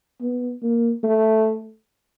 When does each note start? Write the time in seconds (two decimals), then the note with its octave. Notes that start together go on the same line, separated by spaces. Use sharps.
0.21 B3
0.62 A#3
1.03 A3